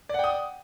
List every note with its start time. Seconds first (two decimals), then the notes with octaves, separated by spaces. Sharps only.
0.09 D5
0.14 F#5
0.19 G5
0.24 D#6